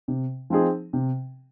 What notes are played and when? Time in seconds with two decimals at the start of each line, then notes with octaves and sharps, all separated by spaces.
0.08 C3
0.50 F3 C4 D#4 G#4
0.93 C3